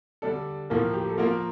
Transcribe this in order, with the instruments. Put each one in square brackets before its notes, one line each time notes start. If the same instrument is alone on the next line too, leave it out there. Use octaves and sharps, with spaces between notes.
[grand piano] D3 G3 D4 [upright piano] A4
[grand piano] A2 F3 A#3 [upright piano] A#4
[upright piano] G4
A4
[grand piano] F3 A#3 F4 [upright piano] A#4